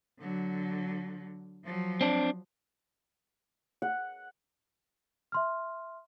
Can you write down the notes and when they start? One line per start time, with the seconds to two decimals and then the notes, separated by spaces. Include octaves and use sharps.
0.20 D3 F#3
1.66 F3 F#3
2.01 C4 D4
3.82 F#5
5.32 E5 C6 F6